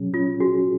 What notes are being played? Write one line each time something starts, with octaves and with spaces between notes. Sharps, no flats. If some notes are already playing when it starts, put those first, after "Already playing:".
Already playing: B2 F#3 C#4 G#4
C#4 F4
F#4 G#4